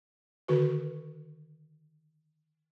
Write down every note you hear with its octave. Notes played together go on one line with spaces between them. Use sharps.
D3 D#3 F#4 B4